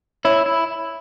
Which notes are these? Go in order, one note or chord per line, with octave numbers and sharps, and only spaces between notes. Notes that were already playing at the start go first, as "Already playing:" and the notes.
E4 C#5
E4